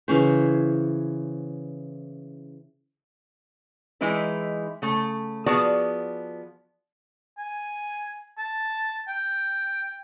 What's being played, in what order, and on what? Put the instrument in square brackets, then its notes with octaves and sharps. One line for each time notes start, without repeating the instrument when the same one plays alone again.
[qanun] C#3 E3 C#4 C5
[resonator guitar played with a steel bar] E3 G#3 D#4 E4 B4
C#3 A3
F3 B3 F#4 G#4 D5 A5
[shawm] G#5
A5
G5